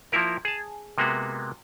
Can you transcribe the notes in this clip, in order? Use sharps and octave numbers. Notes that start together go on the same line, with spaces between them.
F3 A#3 E4 A#4
G#4 A5
C3 G#3 A#3 B3 F#4